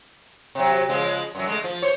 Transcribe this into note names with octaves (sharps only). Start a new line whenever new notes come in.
C3 F#3
C#3 F3 G#3
F#2 F#3
G#3 A3
F3
C5 C#5